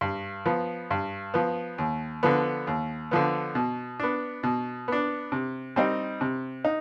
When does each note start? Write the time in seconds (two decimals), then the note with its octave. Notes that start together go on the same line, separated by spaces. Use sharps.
0.01 G2
0.46 F3 B3
0.91 G2
1.34 F3 B3
1.78 D#2
2.23 D3 F3 B3
2.67 D#2
3.11 D3 F3 B3
3.55 B2
4.00 B3 D4
4.43 B2
4.88 B3 D4
5.32 C3
5.76 G3 C4 D#4
6.21 C3
6.65 D#4